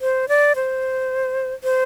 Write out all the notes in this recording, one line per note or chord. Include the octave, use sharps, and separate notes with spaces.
C5
D5
C5
C5